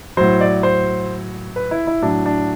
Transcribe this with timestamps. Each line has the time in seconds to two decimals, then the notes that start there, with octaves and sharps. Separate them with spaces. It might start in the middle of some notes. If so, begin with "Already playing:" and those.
0.17 A2 F#3 C5
0.41 D5
0.63 C5
1.56 B4
1.71 E4
1.87 E4
2.02 A2 F#3 D4
2.26 D4